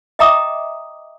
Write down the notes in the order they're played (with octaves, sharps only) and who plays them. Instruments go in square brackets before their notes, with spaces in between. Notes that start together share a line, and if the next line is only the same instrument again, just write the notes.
[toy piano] D#5 E5 G5 A#5 D6 D#6